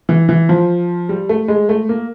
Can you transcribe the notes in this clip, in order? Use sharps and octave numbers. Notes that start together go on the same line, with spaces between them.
E3
E3
F3
G3
A3
G#3
A3
A#3